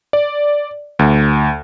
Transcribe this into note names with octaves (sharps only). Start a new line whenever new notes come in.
D5
D2